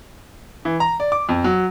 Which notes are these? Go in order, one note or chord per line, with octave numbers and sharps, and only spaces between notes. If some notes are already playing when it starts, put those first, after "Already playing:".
E3
A#5
D5
D6
F2
F#3